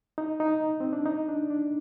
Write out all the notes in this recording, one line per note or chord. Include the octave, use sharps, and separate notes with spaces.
D#4
D#4
C4
D4
D#4
D4
D4